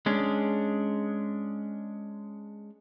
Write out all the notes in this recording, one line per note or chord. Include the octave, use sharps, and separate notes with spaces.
G#3 C#4 D4